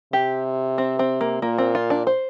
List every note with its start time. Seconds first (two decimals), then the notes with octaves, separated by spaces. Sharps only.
0.13 C3 G4
0.78 C4
0.99 C4
1.21 A#3
1.42 A#2 A#3
1.58 C4
1.75 F4
1.90 D4
2.07 C5